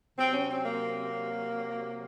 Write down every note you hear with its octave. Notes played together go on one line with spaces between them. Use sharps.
C3 F#3 C4
C#4
C4
A#3